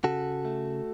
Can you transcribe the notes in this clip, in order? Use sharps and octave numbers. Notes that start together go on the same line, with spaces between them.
C#3 F#4 A4
A3